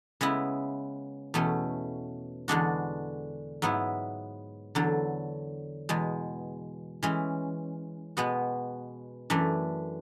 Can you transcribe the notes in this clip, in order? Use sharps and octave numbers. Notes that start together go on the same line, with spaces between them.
C#3 G#3 B3 E4
E2 B2 A3 C#4
E2 D3 G#3 D4 F#4
G#2 F#3 B3 E4
E2 D3 F#3
E2 B2 G#3
E3 G#3 C#4
B2 G#3 B3 F#4
F#2 E3 A3 D4